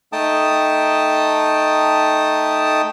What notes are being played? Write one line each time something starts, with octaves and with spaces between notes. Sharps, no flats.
A3 D#4 G5 A5 D#6